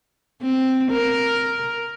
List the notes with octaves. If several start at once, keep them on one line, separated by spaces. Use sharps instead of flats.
C4
A#4